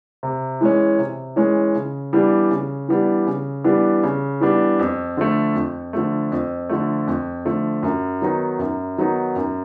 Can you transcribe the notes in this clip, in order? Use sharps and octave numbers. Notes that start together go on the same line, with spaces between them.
C3
E3 G#3 C#4
C3
E3 G#3 C#4
C#3
E3 G3 B3 D4
C#3
E3 G3 B3 D4
C#3
E3 G3 B3 D4
C#3
E3 G3 B3 D4
F2
D3 F3 A3
F2
D3 F3 A3
F2
D3 F3 A3
F2
D3 F3 A3
F#2
D#3 F#3 B3 D#4
F#2
D#3 F#3 B3 D#4
F#2